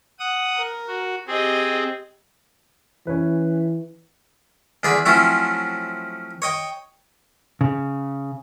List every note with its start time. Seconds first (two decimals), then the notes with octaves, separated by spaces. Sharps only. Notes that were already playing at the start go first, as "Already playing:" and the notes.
0.19 F#5 D#6
0.55 A#4
0.87 F#4
1.27 C4 G4 G#4 D#5
3.07 E3 C#4 B4
4.83 E2 D3 G#4 D5 B5
5.06 F3 F#3 A3 C4 C#4 E4
6.42 C#5 D#5 G5
7.61 C#3